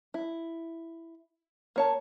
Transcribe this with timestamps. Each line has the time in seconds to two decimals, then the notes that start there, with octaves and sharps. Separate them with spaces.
0.14 E4
1.76 A#3 C#5 A5